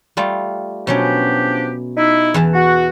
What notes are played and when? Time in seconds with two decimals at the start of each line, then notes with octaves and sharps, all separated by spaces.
0.17 G3 A3 F4
0.87 B2 F3 F#3 C#4 D4 G4
1.97 D#4 E4
2.34 E2 E3 A5
2.54 F#4